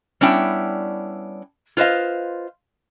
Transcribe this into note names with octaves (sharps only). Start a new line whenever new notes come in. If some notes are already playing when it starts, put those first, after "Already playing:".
G3 B3 C#4 D4 E4 G5
F4 B4 C5 D#5 F5